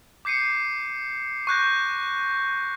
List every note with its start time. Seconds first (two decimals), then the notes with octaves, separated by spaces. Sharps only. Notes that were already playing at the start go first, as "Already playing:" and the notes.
0.25 D6 G6 C7 C#7 D#7
1.47 C#6 F#6 G6 A#6